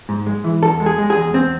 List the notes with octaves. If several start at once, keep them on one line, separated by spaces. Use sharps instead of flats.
G#2
G#3
E3
E2 A4
G#3
G#4
G#3
G#4
E2
E2 C4